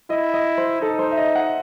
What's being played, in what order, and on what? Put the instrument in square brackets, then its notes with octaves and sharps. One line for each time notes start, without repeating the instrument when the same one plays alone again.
[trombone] E4 [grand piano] D#5
[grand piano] D#5
C5
[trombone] D#4 [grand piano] A4
[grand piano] C5
E5
D#5
F#5